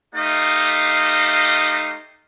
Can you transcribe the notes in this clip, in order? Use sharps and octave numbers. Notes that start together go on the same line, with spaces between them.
A3 D#4 G4 C5 D#5 F5